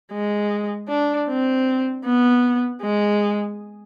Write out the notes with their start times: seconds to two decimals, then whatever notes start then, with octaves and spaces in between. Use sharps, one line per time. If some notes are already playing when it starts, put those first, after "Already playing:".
0.13 G#3
0.89 D4
1.28 C4
2.05 B3
2.82 G#3